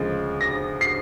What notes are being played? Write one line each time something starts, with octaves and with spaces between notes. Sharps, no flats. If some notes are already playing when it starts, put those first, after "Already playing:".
Already playing: D2 C#3 F3 G#3
A#6
C7